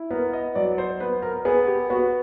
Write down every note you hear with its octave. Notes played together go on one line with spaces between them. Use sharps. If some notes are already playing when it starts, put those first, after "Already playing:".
Already playing: E4
B3 A#4
D#5
F#3 D5
C5
B3 B4
A#4
B3 G#4
G4
B3 F#4